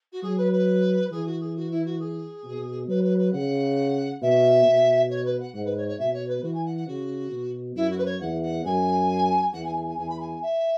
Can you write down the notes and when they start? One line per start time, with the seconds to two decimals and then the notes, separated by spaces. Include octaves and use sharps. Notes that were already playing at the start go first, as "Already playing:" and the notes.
0.12 F#4
0.22 F#3 G#4
0.37 B4
0.52 B4
1.11 E3 G#4
1.26 F#4
1.40 G#4
1.56 F#4
1.70 E4
1.85 F#4
1.99 G#4
2.44 B2
2.88 F#3 B4
3.03 B4
3.18 B4
3.32 C#3 F#5
4.21 B2 E5
4.66 B2
5.10 C#5
5.25 B4
5.40 F#5
5.54 G#2 F#5
5.65 B4
5.77 C#5
5.88 C#5
5.99 B2 E5
6.13 C#5
6.28 B4
6.43 E3 F#4
6.54 G#5
6.65 F#5
6.76 F#5
6.87 C#3 F#4
7.31 B2
7.75 F#2 E4
7.90 F#4
7.98 B4
8.05 C#5
8.20 E2 F#5
8.42 F#5
8.65 F#2 G#5
9.53 E2 F#5
9.64 G#5
9.76 G#5
9.86 G#5
9.98 E2 G#5
10.09 B5
10.19 G#5
10.42 E5